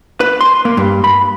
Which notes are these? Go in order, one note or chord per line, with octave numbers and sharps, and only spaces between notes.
B4
C6
A#3
G2
B5